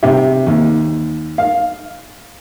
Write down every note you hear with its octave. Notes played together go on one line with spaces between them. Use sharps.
C3
D#2
F5